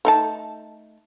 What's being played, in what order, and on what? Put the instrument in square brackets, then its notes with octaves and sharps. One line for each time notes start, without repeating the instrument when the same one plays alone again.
[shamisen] A3 D#4 A5